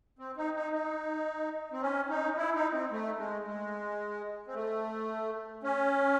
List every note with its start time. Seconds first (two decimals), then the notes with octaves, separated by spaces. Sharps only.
0.19 C4
0.37 D#4
0.56 D#4
0.73 D#4
1.72 C4
1.82 C#4
2.10 D#4
2.37 E4
2.55 D#4
2.73 C4
2.91 A3
3.19 G#3
3.46 G#3
4.47 C4
4.54 A3
5.63 C#4